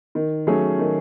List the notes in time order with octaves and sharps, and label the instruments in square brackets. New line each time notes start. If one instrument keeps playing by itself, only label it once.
[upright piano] D#3
F#3 A3 C#4 G#4
D#3